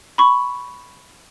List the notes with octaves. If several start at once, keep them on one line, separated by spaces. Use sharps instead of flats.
B5 C#6